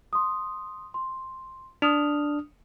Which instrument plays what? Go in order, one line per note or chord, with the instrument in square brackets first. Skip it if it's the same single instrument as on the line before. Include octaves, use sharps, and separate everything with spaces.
[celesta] C6 D#6
C6
[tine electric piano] D4 [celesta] D#6 F6 F7